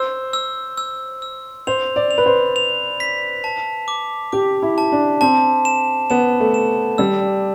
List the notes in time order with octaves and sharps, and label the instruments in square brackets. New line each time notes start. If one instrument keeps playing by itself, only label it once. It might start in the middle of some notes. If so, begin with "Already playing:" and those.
Already playing: [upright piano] C5 [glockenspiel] E6
[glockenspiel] E6
E6
E6
[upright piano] C5 [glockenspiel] F7
[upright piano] D5
[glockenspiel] F7
[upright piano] B4
C5
[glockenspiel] F7
B6
A5
D6
[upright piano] G4 [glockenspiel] D6
[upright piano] E4
[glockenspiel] A5
[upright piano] D4
[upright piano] C4 [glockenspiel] A5
[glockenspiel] E7
[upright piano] B3 [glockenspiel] E7
[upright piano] A3
[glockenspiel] E7
[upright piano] G3 [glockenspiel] E6